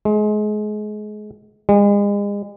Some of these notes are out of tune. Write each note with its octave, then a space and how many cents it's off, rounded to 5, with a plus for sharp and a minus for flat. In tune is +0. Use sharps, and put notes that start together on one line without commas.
G#3 +30
G#3 -35